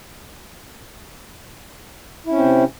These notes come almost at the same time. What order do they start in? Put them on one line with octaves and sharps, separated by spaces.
E4 C#4 C4 C3